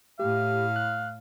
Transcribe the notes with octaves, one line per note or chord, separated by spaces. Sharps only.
A2 G4 F5
F#6